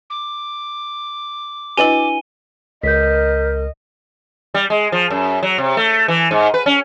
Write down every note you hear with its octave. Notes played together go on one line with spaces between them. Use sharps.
D6
D4 E4 F#4 B4 D#5 G#5 D#7 G7
C#2 A#4 D#5 G6 B6
G3
G#3
F3
F#2
F#3
C3
A3
E3
G#2
B4
C#4